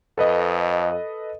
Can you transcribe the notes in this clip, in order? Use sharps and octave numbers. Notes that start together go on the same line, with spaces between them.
F2 A4 B4 D#5